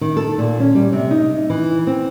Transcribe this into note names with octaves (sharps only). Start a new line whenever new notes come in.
D#3
A4
A#2
C#4
G3
C3
D#4
E3
C4